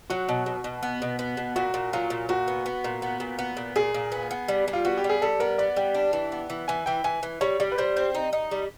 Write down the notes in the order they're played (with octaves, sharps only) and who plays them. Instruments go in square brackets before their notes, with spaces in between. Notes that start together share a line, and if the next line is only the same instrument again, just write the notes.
[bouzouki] F#3 [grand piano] F#4
[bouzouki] B2
B2
B2
B3
B2
B3
B2
[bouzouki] A#2 [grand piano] F#4
[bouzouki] A#2
[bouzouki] F#3 [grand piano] F4
[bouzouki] A#2
[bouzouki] A#2 [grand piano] F#4
[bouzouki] B3
B3
A#2
B3
A#2
B3
A#2
[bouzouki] A#2 [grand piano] G#4
[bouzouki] A#2
B3
B3
G3
G3
[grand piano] F4
[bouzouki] B3 [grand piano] F#4
[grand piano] G4
[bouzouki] G3
[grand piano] G#4
[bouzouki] G3 [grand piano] A4
[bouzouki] B3 [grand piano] A#4
[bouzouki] B3 [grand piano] D5
[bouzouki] G3 [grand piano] G5
[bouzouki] D4
E3
B3
E3
[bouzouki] E3 [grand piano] G#5
[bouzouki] E3 [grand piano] G5
[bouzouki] E3 [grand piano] G#5
[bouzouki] E3
[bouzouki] G3 [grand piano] C#5
[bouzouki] G3 [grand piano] D5
[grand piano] B4
[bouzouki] G3 [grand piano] C5
[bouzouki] C4 [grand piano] C5
[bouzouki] D#4
D#4
G3